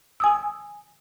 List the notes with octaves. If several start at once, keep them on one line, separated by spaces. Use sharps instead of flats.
G#5 D#6 E6